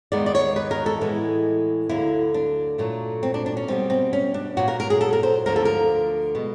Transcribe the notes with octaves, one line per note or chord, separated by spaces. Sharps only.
D#2 D#3 G#3 B3 D5
D5
C#5
B4
A#4
A4
A2 E3 G#3 B3
D2 D3 F#3 A#3 E4
D4
A#2 F#3 A3
C4
D4
D4
C#4
B2 G3 B3 C4
C4
C#4
D4
A#2 F#3 B3 F#4
A#4
A#4
G#4
A4
A#4
C5
D2 D3 F3 A#3 A#4
A4
A#4
B2 G#3